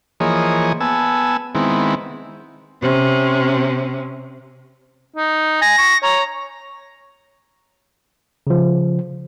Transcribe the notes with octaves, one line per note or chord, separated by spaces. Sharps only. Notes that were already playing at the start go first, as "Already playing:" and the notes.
E3 F3 A#3 G#4 C#5 D#5
B3 G#5 A5 E6
D#3 G#3 B3 C4 E4
C3 C#4
D#4
G#5 A#6
C#6
C#5 A#5
C#3 F3